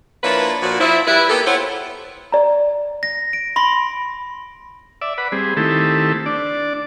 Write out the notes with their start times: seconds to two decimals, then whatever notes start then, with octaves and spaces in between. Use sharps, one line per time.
0.23 F3 A#3 D4 E4 B4 C#5
0.61 A#2 F3 F#4
0.79 F3 E4
1.07 G3 E4 B4
1.29 A#3 B3 G4 A4
1.45 E4 F4 A4 C5 C#5 F#5
2.32 D5 A#5
3.03 A#6
3.33 D7
3.56 B5 C6 A#6
5.01 D5 E5
5.18 B4 F#5 B5
5.32 G3 C4 G#4
5.57 D#3 A3 C4 E4 G4 A4
6.26 D4 D5